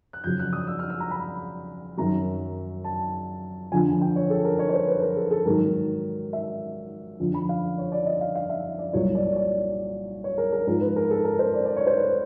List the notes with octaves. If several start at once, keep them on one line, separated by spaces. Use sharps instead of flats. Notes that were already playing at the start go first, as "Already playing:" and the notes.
F#6
F2 C#3 F#3 G6
F#6
D#6
E6
F6
E6
A#5
B5
F#2 D#3 F#3 A#5
A5
F2 D3 F3 G#5
G5
C#5
A4
A#4
C#5
C#5
C5
B4
A#4
A4
A4
G#2 D#3 F#3 A#4
E5
F2 D3 F3
B5
F5
C#5
D5
D#5
F5
F5
E5
D5
C2 A#2 F#3 C#5
D5
C#5
D5
C#5
A#4
A#4
G#2 F3 A#4
B4
A#4
A4
A#4
C5
D5
D5
C#5
C5
B4